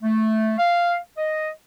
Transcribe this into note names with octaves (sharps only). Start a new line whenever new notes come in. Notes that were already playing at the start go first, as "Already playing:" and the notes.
A3
F5
D#5